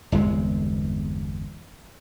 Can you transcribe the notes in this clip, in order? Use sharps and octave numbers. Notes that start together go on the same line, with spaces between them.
G1 E2 C3 G#3